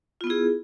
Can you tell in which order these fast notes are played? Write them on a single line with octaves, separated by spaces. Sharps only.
F4 B3 E4 G#4